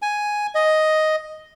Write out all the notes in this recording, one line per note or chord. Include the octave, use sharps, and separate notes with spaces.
G#5
D#5